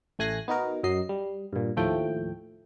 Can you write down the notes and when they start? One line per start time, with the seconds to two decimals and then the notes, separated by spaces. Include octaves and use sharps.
0.19 A1 A3 G#5 F#6 A#6 C7
0.48 B3 D#4 F#4 A#4
0.83 F#2 F#3 D#5 C7
1.09 G3
1.53 G2 A#2
1.77 D#2 A2 F3 A3 G5